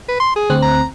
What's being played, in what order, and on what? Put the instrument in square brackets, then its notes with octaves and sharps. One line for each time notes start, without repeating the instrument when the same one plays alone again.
[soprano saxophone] B4
C6
G#4
[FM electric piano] D2 C4 F#6
[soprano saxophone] A#5